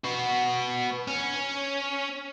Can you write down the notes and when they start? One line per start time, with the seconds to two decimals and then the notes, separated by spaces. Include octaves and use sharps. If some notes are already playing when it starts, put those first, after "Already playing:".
0.05 B3 F#4
1.08 C#4